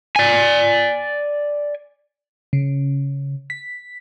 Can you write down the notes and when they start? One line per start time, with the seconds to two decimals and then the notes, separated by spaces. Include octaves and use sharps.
0.16 D5 G#5
2.53 C#3
3.50 B6